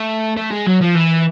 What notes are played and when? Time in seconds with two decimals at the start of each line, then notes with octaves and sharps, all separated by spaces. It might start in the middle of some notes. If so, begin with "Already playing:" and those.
Already playing: A3
0.37 A3
0.51 G#3
0.66 F#3
0.81 F3
0.95 E3